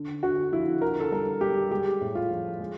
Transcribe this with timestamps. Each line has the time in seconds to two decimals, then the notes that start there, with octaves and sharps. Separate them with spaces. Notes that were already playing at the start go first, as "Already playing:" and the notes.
Already playing: D3
0.23 D3 F#4
0.52 F3 E4
0.82 D3 A#4
1.00 A4
1.11 G3 A#4
1.41 G3 G4
1.70 G#3 G4
2.01 A2
2.15 F4
2.31 F3
2.60 G#3